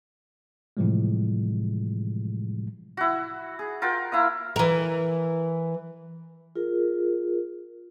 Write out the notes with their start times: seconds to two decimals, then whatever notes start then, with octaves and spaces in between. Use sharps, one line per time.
0.77 A2 C3 E3 F3 G3 G#3
2.97 E4 F#4
3.59 G#4
3.82 F4 F#4 A#4 G5
4.12 A#3 E4 F5 D#6
4.56 E3 A#4
6.55 F4 G#4 A#4